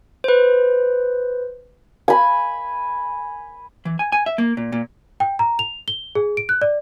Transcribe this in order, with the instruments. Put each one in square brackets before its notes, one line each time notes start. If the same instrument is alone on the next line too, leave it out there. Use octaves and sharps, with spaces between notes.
[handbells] B4 C5
[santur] G#5 B5
[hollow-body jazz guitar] E3
G#5
G#5
E5
A#3
A#2
A#2
[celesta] G5
A#5
F7
G7
G#4
D7
F#6
D5